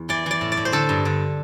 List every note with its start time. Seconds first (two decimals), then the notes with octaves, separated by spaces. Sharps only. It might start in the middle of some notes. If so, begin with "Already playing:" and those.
Already playing: E2
0.09 E3 D5
0.26 E3 D5
0.41 A2
0.52 D5
0.57 A2
0.65 C5
0.72 D3 A4
0.89 G2
1.05 D3